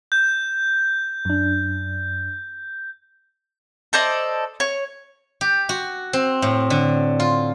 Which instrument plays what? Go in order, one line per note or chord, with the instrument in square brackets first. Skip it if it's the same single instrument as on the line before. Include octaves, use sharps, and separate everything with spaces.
[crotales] G6
[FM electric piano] F#2 D4
[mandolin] A4 C5 D5 D#5
C#5
[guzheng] G4
F#4
C4
A2
D3
F4